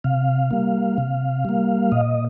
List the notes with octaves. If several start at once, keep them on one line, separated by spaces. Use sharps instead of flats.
C3 F5
G3 A#3
C3
G3 A#3
A#2 D#5